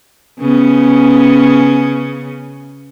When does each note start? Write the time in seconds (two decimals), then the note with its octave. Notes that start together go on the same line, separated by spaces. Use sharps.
0.40 C#3 B3 C#4